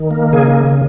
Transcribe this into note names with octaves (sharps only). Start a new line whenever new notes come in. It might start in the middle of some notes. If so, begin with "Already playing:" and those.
Already playing: D#3
A#3
C#3 G#4